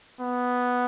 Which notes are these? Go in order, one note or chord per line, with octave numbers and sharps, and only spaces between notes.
B3